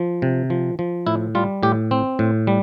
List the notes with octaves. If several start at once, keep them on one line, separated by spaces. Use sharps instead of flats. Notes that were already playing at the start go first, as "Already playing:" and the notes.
Already playing: F3
C3
F3
F3
A2 E4
G3 F4
A2 G4
C4
A2
G3